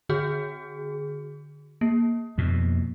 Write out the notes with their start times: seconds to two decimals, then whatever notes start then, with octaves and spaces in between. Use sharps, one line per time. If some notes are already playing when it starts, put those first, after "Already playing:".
0.09 D3 F#4 G#4
1.81 A#3
2.38 F2 B2